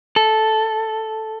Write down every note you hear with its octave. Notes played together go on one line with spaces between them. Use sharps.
A4